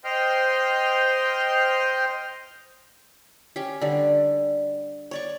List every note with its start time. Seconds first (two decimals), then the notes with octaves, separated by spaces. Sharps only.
0.04 C5 D#5 G5 C6 F6
3.56 C#4 G4
3.81 D3 G3
5.11 C#5 D5 C#6